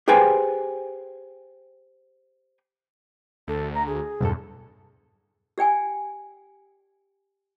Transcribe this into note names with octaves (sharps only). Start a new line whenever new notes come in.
G4 G#4 B4 C5 G5 G#5
D2 A4
A#5
G#4
B1 E2 G2 A4
G4 D5 G5 G#5